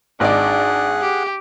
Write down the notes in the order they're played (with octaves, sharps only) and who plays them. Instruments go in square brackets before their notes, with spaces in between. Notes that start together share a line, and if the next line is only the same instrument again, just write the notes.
[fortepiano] G#1 D#4 D5 [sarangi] D4 [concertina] G#4 F#5
[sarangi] G4